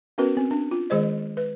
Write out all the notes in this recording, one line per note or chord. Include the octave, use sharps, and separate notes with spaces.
B3 C#4 F#4 A#4 B4
C4
D4
F4
D#3 G#3 G#4 C5 D#5
B4